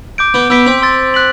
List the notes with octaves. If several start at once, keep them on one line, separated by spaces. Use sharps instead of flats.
D6 G6 D7
B3
B3 E6 B6 D7
C4
C6 E6 A6
F#6 B6 F#7